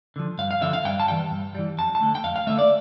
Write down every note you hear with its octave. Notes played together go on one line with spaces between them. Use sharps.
D3 F3
G2 F5
F5
D3 F3 E5
F5
G2 G5
A5
E3 G3 G5
G2
E3 G3
F2 A5
A5
D3 A3
G5
F2 F5
F5
D3 A3 E5
D5